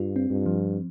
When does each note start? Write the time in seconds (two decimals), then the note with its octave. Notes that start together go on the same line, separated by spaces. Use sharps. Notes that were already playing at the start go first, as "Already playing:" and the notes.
Already playing: G2 F4
0.16 C4
0.30 G2
0.46 F3